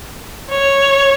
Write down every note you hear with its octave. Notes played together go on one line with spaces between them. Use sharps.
C#5